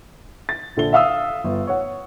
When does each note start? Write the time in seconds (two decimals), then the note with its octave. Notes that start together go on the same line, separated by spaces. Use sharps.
0.49 A6
0.77 A#1 D3 A4 G7
0.93 E5 F5 D#6 E6
1.44 G1
1.67 C#5 F#5